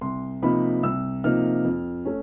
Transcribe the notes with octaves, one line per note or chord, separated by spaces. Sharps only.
C2 C6
C3 F3 A#3 D#4 B5
C2 E6
C3 F3 A#3 D#4 F6
F2
A3 C#4